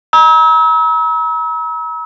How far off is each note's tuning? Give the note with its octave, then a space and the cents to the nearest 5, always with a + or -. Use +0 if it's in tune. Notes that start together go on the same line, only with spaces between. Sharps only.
A#5 +40 E6 -40